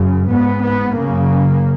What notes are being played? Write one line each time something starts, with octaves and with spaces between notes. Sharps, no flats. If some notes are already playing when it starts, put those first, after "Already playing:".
Already playing: F#2 C#3
G#2 B3
B3
F#2 C#3 A#3